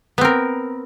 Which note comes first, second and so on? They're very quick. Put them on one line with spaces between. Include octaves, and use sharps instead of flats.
B3 C4 A#4